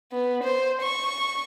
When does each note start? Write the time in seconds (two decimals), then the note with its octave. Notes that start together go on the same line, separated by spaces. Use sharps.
0.13 B3
0.44 C5
0.82 C#6